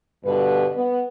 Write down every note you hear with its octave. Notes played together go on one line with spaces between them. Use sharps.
G2 B2 D3 B4
B3